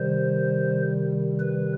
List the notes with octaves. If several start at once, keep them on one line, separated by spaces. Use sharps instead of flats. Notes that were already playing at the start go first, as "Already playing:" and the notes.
Already playing: C3 D#3 G3 C5
B4